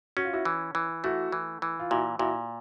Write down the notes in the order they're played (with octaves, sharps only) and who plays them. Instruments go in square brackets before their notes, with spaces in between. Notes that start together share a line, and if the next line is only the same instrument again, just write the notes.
[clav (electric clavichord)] C#4 [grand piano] F#4
[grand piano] F4
E4 F#4
[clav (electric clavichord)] E3
E3
[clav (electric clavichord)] A3 [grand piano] E4 F#4
[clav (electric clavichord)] E3
E3
[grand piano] F4
[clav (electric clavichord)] A#2 [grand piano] E4 F#4
[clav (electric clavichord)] A#2 [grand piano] E4 F#4